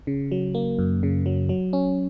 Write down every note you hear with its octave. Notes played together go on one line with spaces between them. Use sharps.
C#3
F#3
A#3
F#2
C#3
F#3
F#3
C#4